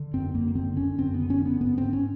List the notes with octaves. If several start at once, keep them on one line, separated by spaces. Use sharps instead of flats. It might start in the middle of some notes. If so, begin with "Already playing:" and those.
Already playing: D3
F#2 C4
F#2 A#3
D3 C4
D3 C#4
F#2 C4
B3
D3
C#4
D3 B3
G#2 B3
G#2 C4
C#4